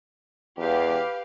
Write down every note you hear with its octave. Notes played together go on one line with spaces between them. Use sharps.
E2 G4 B4 F5